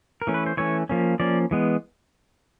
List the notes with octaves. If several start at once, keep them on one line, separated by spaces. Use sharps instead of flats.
A#4
E3 A3 C#4
B4
C5
E3 A3 C#4 C#5
F3 A#3 C#4
F3 A#3 C#4 D5
E3 G#3 B3